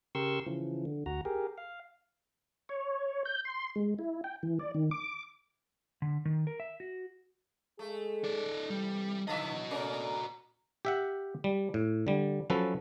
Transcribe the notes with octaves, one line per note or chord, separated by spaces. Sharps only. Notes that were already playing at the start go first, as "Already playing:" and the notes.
C#3 G4 A#4 C6 C#6 E6
C#3 E3 F3
D3
D2 F#4 A#5
G4 G#4 A#4
F5
C#5
G6
C6
G#3
E4
G5
E3
D5
D#3
D6
D3
D#3
A#4
E5
F#4
G#3 A3 G#4
D#4 D5
C3 E3 G3
D3 E3 F#3 F#4 D#5 E5
A3 C#4 A4 A#4 D5
G4 E5 F#5
G3
A2
D3 G3
F3 F#3 C#4 A4 B4